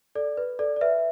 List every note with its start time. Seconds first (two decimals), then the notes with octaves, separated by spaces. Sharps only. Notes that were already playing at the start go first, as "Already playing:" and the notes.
0.15 A4 D5
0.37 B4
0.59 A4 D5
0.76 D5
0.81 B4 E5